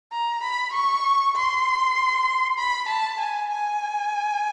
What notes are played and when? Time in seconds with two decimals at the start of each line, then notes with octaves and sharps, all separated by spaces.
0.12 A#5
0.43 B5
0.73 C#6
1.36 C6
2.58 B5
2.88 A5
3.20 G#5
3.51 G#5